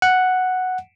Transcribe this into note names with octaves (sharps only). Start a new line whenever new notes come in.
F#5